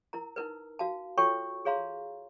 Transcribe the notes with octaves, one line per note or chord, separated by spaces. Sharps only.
E4 A#4 A#5
D#4 E4 A#4 B4
F#4 F5 A5
F4 F#4 A4 C#5 G5 C#6
G#4 C#5 F5 A#5 C6